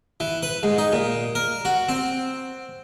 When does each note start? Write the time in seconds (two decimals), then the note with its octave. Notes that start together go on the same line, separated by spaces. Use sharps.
0.20 E3
0.43 B4
0.63 G#2
0.78 D#4
0.92 A#2
1.35 A#4
1.65 F#4
1.89 C4